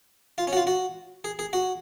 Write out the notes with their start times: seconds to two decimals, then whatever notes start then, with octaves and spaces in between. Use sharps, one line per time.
0.38 F4
0.47 C#4
0.53 F#4
0.57 F4
0.67 F#4
1.24 G#4
1.39 G#4
1.53 F#4